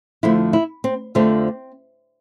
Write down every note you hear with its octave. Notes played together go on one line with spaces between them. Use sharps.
F2 D3 F3 A3 E4
E4
C4
F2 D3 F3 A3 C4